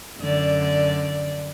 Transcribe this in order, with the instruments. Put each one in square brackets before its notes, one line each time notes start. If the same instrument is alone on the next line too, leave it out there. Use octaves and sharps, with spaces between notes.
[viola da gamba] F#2 D3 D5